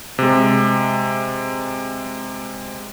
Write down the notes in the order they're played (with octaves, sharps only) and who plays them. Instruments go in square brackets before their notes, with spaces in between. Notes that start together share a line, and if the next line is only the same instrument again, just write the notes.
[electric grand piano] C3 G#3